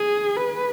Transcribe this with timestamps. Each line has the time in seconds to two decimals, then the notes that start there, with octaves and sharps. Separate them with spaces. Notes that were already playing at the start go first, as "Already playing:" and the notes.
Already playing: G#4
0.37 B4